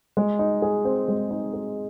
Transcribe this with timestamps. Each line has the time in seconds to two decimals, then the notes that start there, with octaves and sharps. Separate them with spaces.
0.17 G#3
0.39 D#4
0.62 G#4
0.85 C4
1.08 G#3
1.31 D#4
1.54 G#4